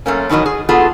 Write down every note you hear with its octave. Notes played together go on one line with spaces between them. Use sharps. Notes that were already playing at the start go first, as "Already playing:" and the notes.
F#2 A3 A#3 C#4
B2 D#3 E3 F#3 D#5
G#4
B3 F4 F#4 G#4 A4